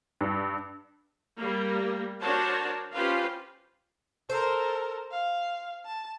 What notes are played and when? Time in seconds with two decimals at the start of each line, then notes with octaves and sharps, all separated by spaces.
0.21 G2
1.37 G3 A#3
2.20 D4 F#4 A#4 C5 C#5 A5
2.93 C#4 F4 G4 B4 C5 F5
4.30 A4 A#4 C5
5.11 F5
5.86 A5